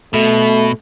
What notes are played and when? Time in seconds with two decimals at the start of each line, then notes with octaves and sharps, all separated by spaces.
0.14 B2 A3